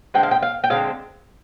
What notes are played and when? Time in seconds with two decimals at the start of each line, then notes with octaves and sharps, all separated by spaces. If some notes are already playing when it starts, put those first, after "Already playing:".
0.14 D3 G#3 C4 G5
0.23 F5
0.31 G5
0.42 F5
0.64 G5
0.70 D3 G#3 C4 F5